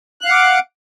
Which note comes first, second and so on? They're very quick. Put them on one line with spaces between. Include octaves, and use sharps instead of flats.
F#6 F5 F#5 D6